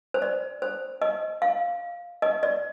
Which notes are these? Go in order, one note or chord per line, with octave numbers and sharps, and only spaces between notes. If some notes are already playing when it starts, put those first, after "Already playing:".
C5
D5
C5
D#5
F5
D#5
D5